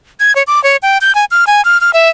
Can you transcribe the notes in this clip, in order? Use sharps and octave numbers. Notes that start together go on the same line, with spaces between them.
G#6
C#5
D6
C#5
G5
G6
G#5
F6
G#5
F6
F6
E5